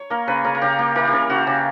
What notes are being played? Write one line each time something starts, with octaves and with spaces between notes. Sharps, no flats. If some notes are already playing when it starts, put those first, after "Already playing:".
Already playing: C#5
A#3 A#4
C#3 B4
C#3 A#4
A#4
C#3 G4
A#3 G4
E3 A#4
G4
C#3 A#4
C#3 F#4
C#3 G4